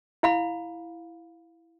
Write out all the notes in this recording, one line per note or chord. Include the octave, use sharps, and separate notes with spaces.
E4 F5 B5